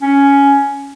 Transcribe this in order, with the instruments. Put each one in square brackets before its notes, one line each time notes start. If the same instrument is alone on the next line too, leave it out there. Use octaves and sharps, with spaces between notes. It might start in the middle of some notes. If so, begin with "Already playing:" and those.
[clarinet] C#4